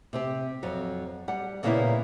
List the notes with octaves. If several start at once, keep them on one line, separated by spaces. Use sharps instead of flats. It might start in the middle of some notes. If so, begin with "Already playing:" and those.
C3 C4 G4
F2 F#3
G3 F#5
A#2 C#3 G3 A#3 B3 E4